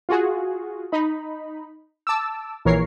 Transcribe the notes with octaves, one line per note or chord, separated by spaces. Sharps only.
F4 F#4 G#4
D#4 B5
A5 D6 E6
A#1 E3 A#4 C#5 C7